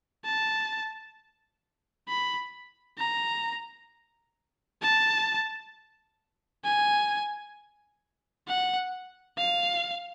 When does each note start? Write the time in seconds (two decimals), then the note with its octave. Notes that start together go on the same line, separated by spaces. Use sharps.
0.24 A5
2.08 B5
2.98 A#5
4.82 A5
6.65 G#5
8.48 F#5
9.38 F5